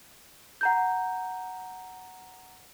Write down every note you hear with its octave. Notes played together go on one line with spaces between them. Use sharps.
F#5 A#5 G6